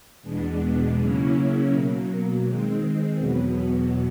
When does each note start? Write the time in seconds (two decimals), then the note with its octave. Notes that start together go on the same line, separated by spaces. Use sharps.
0.22 E2 B2 G#3 B3 D4
0.96 C#3 F#3 A#3 C#4 E4
1.70 B2 F#3 A#3
2.44 D#3 G#3 C4
3.17 E2 B2 F#3 B3